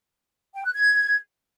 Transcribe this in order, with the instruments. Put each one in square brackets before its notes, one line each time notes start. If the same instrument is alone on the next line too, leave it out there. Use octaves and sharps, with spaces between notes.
[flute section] G5
F#6
G#6